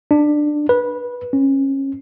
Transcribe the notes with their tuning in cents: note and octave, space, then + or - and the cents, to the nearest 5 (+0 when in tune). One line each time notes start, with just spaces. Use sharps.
D4 +15
B4 -20
C#4 -25